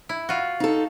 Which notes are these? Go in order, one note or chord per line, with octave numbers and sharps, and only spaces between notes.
E4
F4 F#4
D#4 A4